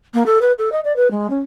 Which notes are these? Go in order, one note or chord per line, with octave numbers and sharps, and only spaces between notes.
A#3
A4
B4
A4
D#5
D5
B4
G#3
C#4